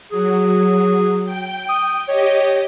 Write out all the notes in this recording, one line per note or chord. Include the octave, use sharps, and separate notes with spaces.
F#3 G#4
G5
D#6
G4 C#5 D#5